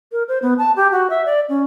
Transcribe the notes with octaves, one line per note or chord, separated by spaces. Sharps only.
A#4
C5
B3
A5
G4
F#4
E5
D5
C#4